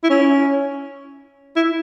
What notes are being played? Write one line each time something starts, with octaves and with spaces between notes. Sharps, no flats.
E4
C#4
E4